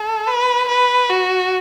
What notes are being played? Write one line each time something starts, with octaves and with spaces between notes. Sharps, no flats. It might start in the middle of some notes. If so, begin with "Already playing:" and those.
Already playing: A4
B4
B4
F#4